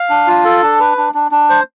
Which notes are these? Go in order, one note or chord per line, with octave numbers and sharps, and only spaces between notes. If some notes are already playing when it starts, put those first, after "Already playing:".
Already playing: F5
D4
F4
A4
D4
B4
D4
D4
D4
C5